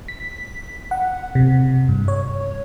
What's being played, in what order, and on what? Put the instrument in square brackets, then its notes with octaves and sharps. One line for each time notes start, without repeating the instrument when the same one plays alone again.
[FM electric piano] B6
F#5
C3
G2
C#5